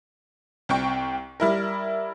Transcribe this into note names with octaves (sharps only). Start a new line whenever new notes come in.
C2 C4 G5 C#6
G3 E4 A#4